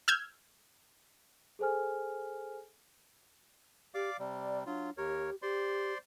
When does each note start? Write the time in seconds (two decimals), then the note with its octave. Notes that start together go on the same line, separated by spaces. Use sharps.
0.08 E6 F6 G6 G#6
1.59 G#4 A4 C5 G#5 F6
3.94 G4 D5 F5 D6
4.19 C3 G3 D5
4.40 D5
4.66 F#3 D4 F4
4.97 D#2 G4 A#4 C#5
5.42 G4 C5 D5 C6